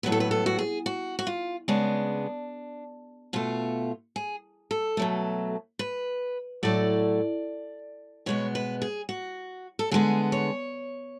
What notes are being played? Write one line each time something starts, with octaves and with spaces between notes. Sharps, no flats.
A2 F#3 B3 B4
A4
B4
A4
F#4
G#4
F#4
F#4
F4
C#3 G#3 B3 D4
B2 A3 F4
G#4
A4
B2 F#3 A3
B4
A2 F#3 A3 D5
B2 G#3 B3 C#5
B4
G#4
F#4
A4
D3 G#3 B3 G#4
C#5